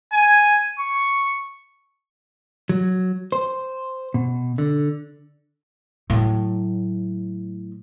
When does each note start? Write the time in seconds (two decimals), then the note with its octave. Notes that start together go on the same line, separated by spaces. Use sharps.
0.12 G#5
0.79 C#6
2.69 F#3
3.32 C5
4.14 B2
4.58 D3
6.10 A2 F#3